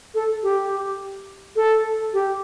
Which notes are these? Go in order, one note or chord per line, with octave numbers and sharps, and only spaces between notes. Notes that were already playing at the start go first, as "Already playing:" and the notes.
A4
G4
A4
G4